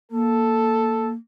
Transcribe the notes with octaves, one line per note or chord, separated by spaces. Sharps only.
A#3 A4